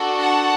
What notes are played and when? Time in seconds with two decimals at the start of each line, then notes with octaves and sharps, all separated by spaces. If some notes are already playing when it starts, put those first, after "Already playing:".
Already playing: D4 F#4 A4
0.18 F#5 A5